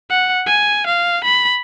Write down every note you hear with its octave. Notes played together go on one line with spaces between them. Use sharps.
F#5
G#5
F5
B5